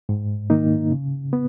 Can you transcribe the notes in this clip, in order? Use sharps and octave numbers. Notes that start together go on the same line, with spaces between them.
G#2
D#3 A#3 D#4
C#3
B3